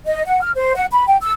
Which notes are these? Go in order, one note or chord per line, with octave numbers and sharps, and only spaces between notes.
D#5
F#5
F6
C5
F#5
B5
G5
E6